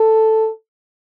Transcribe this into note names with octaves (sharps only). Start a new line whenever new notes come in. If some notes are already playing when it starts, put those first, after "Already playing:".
Already playing: A4